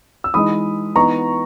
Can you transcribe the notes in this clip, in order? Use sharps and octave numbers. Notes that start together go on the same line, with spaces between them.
E6
E3 G#3 D#4 B5 D#6
E3 B3 D#4 A#5 C#6